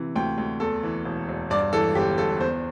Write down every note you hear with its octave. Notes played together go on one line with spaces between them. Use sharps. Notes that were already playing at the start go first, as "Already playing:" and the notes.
Already playing: C3 E3
D2 G5
D2
E2 A4
E3
E1
E1
G2 D5
E3 A4
G1 G4
G1 A4
E2 C5